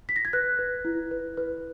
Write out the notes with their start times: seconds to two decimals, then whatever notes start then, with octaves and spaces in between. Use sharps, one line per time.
0.09 B6
0.16 A#6
0.25 G#6
0.33 B4 F#6
0.59 B4
0.85 E4
1.11 B4
1.37 B4